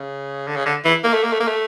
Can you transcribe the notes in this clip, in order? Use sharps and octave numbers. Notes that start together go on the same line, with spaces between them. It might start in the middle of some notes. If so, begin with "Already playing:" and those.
Already playing: C#3
D3
C#3
D3
E3
A#3
A3
A#3
A3
A#3
A3